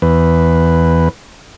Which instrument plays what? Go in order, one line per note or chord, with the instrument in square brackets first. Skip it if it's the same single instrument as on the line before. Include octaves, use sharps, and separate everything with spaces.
[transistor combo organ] E2 B4